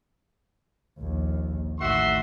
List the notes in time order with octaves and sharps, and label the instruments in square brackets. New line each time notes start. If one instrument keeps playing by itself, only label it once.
[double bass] A#1 D#2
[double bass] A1 D#3 [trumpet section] F#4 E5 C6